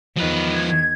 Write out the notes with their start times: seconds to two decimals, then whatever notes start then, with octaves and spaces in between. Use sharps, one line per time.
0.17 E2 D#3 F3 B4
0.52 G#6